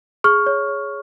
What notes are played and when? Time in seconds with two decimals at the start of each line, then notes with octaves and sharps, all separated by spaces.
0.24 G#4 C#6 F6
0.46 C#5
0.68 C#5